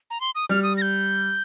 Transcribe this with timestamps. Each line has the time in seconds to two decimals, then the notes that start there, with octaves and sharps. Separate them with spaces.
0.10 A#5
0.21 C6
0.35 D#6
0.49 G3 F6
0.63 D#6
0.77 A#6
0.82 G6